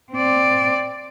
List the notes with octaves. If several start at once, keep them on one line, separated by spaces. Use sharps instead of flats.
C4 D5